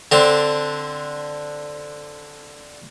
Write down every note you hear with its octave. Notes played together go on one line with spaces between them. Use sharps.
D3 C4 D4